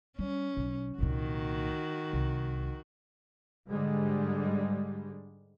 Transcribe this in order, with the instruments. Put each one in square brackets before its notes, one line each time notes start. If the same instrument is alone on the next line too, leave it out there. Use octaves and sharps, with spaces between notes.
[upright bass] G3 [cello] C#4
[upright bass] B1
[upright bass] C2 A#2 [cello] D#3 F#4
[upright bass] C2
[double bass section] G#2 D3 G3 G#3